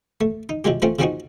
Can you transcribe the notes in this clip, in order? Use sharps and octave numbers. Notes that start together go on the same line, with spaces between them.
A3
D#4
C3 F3 F#3 G#3 G4
F3 A3 C4 C#4 F4
C#3 F3 C4 C#4 D#4 F#4